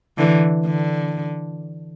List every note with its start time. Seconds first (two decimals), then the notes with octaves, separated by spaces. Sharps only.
0.18 D3 E3
0.66 D3